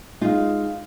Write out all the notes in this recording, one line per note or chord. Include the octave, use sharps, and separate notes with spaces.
G#3 D#4 F4 F5